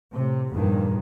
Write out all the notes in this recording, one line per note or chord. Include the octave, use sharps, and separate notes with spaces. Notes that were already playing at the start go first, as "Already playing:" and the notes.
A2 C3
E2 G2 A#2 D#3 F3